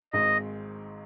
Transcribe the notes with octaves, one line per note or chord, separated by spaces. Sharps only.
G#1 G#2 D#3 G#3 C4 D#5